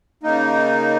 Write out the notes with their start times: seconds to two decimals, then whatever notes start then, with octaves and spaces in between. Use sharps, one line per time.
0.23 C#3 A#3 D#4